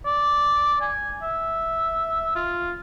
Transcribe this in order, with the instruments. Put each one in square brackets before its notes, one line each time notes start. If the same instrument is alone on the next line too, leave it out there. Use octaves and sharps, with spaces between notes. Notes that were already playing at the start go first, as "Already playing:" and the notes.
[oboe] D5
G#5
E5
F4